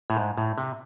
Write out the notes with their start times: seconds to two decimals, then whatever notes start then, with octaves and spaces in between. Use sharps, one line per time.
0.10 A2
0.17 G#2
0.37 A2
0.58 C3